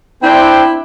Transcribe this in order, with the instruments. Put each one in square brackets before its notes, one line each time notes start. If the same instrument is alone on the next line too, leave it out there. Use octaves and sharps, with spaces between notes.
[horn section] C4 D4 G5 [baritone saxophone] E4